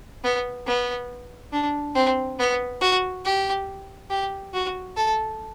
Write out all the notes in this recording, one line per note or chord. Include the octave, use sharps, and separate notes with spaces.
B3
B3
D4
C4
B3
F#4
G4
G4
F#4
A4